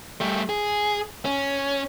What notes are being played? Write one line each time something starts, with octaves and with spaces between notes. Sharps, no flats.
G3 A3
G#4
C#4